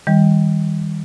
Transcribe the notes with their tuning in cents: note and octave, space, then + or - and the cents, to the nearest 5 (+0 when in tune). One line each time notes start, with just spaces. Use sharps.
D#3 +30 G3 +20